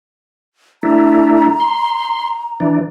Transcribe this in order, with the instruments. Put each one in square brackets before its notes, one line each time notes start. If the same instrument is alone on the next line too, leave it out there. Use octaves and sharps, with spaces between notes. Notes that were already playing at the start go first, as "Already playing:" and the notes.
[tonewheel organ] A3 D4 E4 [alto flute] A#5
[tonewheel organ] C6
E3 D4